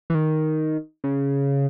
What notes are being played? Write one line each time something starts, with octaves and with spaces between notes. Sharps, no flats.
E3
D#3
C#3